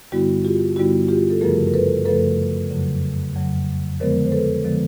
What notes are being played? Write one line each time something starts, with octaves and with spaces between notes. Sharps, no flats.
G2 D3 G3 B3 E4 F#4
F4 G4
G2 D3 G3 B3 E4 F#4
F4 G4
A4
F#2 C#3 F3 A3 G#4 A#4
A#4
A4 B4
F#2 C#3 F3 A3 A4 B4
F2 C#3 F#3
F2 C#3 F#3
D3 F3 G#3 B3 A#4 C5
C5
A4 B4
D3 F3 G#3 B3